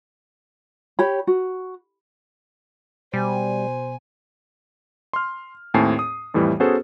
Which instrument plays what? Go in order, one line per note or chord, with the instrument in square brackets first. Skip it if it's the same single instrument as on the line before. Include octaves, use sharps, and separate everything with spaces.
[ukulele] G4 C#5 B5
F#4
[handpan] B2 [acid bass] G3 [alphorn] C5 [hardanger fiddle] G#5
[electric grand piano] C6 F6
D#2 A2 C4 G#5 A5 C7
D#6
F2 A2 E3 G3
B3 C#4 F#4 G#4 A4 C5